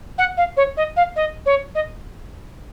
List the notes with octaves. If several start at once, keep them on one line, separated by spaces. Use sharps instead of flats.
F#5
F5
C#5
D#5
F5
D#5
C#5
D#5